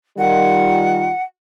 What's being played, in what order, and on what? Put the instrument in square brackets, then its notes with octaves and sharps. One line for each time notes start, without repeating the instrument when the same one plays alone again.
[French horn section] D#3 G3 F4 [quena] F#5